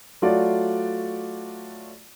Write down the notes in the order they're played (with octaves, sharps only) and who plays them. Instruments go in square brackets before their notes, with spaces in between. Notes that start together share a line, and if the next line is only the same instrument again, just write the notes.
[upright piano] F#3 A3 F4 F#4 D5